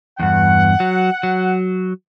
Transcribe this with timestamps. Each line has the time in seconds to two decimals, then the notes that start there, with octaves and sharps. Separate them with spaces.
0.20 E2 G2 F#5
0.80 F#3
1.23 F#3